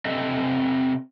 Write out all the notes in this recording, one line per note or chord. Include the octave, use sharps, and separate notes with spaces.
C3 C4 A4 D#5 E5